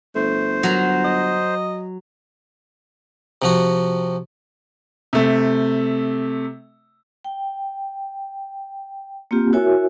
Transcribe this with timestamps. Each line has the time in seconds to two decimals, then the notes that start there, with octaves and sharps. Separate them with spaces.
0.15 G1 A3 C5
0.63 F#3 A#5
1.04 D#5
3.42 C3 F3 F#4
5.13 C3 A3
7.24 G5
9.31 A#3 C4 F4 G4
9.53 E4 F#4 A#4 C#5 E5 G#5